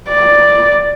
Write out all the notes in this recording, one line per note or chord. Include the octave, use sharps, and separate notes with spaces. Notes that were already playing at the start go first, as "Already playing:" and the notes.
D5